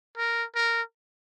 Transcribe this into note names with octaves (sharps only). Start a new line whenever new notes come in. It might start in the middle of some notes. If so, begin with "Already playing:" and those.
A#4
A#4